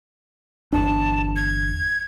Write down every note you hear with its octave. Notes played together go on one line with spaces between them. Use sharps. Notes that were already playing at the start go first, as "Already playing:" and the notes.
G1 E2 D4 A5
G#6